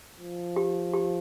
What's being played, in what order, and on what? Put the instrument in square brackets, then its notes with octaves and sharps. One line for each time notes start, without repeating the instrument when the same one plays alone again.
[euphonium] F3
[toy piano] G4
G4